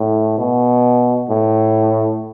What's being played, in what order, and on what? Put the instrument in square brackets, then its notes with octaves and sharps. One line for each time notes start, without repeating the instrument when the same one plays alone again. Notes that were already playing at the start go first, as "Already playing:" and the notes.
Already playing: [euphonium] A2
B2
A2